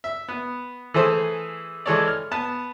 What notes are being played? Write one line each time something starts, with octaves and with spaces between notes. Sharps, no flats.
E5
B3
E3 A3 G#4 A4 C5
E3 G#3 A4 C#5 D5
F6
B3 A5